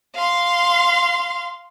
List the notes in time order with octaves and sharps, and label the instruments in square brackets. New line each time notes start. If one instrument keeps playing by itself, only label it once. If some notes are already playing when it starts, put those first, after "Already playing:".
[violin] F5 C6